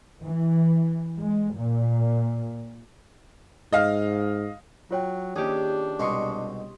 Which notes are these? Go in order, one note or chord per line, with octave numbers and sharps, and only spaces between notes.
E3
G#3
A#2
G#2 D#5 F5 F6
F#3 F4 C#5 G5
D#2 C#4 D4 G4 G#4
C2 B2 G#3 C6 C#6 D#6